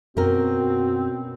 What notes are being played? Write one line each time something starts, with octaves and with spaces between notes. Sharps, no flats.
F#2 B2 C4 C#4 F#4 A#4